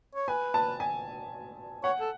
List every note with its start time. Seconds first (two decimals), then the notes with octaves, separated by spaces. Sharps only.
0.15 C#5
0.28 B4 G#5
0.54 A5
0.80 G#5
1.84 C#5 F#5
2.00 A4